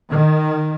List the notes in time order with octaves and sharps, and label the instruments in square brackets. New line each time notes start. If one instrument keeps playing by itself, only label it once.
[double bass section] D#3